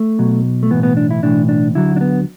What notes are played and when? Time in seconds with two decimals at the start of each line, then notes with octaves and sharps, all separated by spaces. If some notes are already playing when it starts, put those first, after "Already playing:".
Already playing: A3
0.19 B1 B2 F#3
0.63 A3
0.71 B1 A2 E3 B3
0.83 B3
0.97 D4
1.11 E4
1.22 B1 A2 E3 D4
1.49 D4
1.75 D2 D3 F#3 E4
1.96 D4
2.01 B3